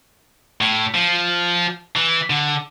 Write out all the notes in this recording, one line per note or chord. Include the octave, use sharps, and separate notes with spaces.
A2
F3
E3
D3